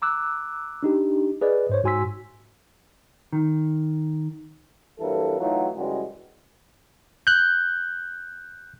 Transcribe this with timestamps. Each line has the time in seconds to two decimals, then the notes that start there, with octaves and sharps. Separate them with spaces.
0.02 A#5 D6 E6 F#6
0.83 D4 D#4 G4
1.41 G#4 B4 D5 D#5
1.69 G#2 C5 C#5
1.84 G#2 F#4 G#5 C6 E6 B6
3.33 D#3
5.00 G2 E3 F#3 A#3 A4
5.40 E3 F#3 A3 D#4 F4 F#4
5.76 F#2 C#3 E3 G3 G#3 F#4
7.27 F#6 G6